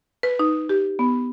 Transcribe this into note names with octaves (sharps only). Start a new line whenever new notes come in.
B4
D#4
G4
B3